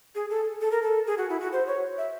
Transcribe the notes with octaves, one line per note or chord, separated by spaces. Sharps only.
G#4
A4
A4
A#4
A4
G#4
F#4
E4
F#4
C5
C#5
E5